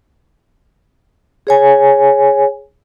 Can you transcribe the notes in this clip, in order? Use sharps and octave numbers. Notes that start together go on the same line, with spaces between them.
G#4 C#5 G#5